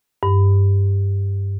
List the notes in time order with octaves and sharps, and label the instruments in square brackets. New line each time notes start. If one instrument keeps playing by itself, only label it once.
[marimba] G2